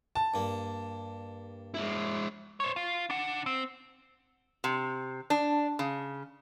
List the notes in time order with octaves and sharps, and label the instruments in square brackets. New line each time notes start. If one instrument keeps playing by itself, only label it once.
[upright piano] A5
[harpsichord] G2 A#3
[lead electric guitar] G#3 E4
C5 C#5
F4
D4 F#5
C4
[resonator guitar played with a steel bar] C3
D4
C#3